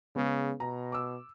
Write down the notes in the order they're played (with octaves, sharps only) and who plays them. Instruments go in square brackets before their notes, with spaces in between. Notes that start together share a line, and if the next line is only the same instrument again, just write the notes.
[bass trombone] C#3 [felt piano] G#3 B3
[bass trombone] B2 [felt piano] A#5
[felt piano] D6 E6